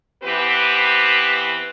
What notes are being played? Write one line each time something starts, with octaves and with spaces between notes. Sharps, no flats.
E3 B3 C4 G4 B4